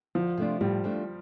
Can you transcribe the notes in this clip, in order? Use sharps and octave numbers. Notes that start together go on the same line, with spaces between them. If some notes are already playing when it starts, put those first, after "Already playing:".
D2 F3
C3 A3 D4 F4
A2 G3
F3 A3 D4